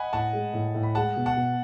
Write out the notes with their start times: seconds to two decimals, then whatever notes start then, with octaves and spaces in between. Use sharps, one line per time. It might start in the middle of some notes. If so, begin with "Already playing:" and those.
Already playing: D#5 F#5 G#5 B5
0.13 A2 F#5 A5
0.33 G#3
0.53 A2
0.74 A2
0.83 B5
0.95 G#3 F#5 A5
1.16 B2
1.26 F#5 A5
1.36 B2